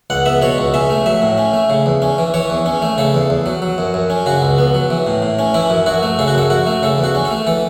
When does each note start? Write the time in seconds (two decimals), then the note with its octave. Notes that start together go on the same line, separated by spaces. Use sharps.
0.10 C#2 F#5
0.26 B3 E5
0.42 B2 C#5
0.58 C#2
0.74 C#4 E5
0.90 A3
1.06 F#3 E5
1.22 A2
1.38 C#4
1.53 A3
1.70 C#3
1.86 E2
2.02 C#4
2.18 E3
2.34 E3 C#5
2.50 E2
2.66 C#4
2.82 A3
2.98 C#3 A4
3.14 E2
3.30 E2
3.46 F#3
3.62 F#3
3.78 F#2
3.94 F#2
4.10 C#4
4.26 C#3 F#4
4.42 C#2
4.58 B3
4.75 F#3
4.90 E3
5.07 A2
5.22 A2
5.39 C#4
5.54 E3 E4
5.70 F#2
5.86 F#2 F#4
6.03 A3
6.19 C#3 A4
6.28 F#4
6.35 F#2 A4
6.50 F#2 F#4
6.67 A3
6.83 C#3 A4
6.98 E2
7.04 F#4
7.15 C#4
7.25 A4
7.31 A3
7.47 E3 A4